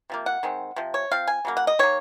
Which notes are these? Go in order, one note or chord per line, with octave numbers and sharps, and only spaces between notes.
C3 F3 A#3
F#5
D#3 G#3 C4
C3 F3
C#5
F3 C4 F5
G#5
C#3 F#3 A#3
F#5
D#5
D#3 A#3 C#5